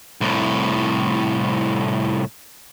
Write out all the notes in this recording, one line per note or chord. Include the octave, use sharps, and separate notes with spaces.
C2 A2